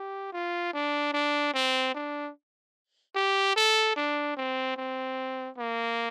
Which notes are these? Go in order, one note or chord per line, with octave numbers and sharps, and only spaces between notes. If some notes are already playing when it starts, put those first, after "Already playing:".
Already playing: G4
F4
D4
D4
C4
D4
G4
A4
D4
C4
C4
A#3